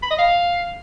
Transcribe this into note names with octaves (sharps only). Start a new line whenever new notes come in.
B5
D#5
F5